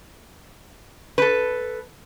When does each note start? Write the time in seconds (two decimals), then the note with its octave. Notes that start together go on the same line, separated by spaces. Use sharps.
1.18 A4 B4